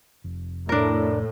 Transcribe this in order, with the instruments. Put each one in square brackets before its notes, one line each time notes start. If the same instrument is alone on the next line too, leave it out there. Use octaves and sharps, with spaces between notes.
[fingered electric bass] F1
[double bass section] A2 [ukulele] D4 A#4